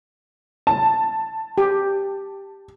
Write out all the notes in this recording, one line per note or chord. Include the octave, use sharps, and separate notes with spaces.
A5
G4